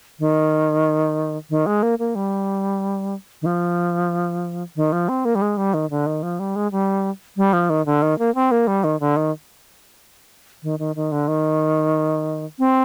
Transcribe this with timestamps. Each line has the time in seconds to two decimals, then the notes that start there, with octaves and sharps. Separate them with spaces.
0.20 D#3
1.50 D#3
1.66 G#3
1.83 A#3
1.99 A#3
2.15 G3
3.42 D#3
3.46 F3
4.76 D#3
4.92 F3
5.09 C4
5.25 A#3
5.35 G3
5.42 G#3
5.57 G3
5.74 D#3
5.90 D3
6.06 D#3
6.23 F3
6.39 G3
6.56 G#3
6.72 G3
7.37 G3
7.53 F3
7.70 D#3
7.86 D3
8.02 D#3
8.19 A#3
8.35 C4
8.51 A#3
8.67 G3
8.84 D#3
9.00 D3
9.17 D#3
10.63 D#3
10.79 D#3
10.96 D#3
11.12 D3
11.28 D#3
12.59 C4